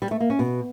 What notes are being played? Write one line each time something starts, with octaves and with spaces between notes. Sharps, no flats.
G3
A3
A#3
C#4
B2